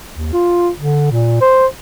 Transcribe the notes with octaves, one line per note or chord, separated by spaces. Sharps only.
D#2
F4
D3
A#2
C5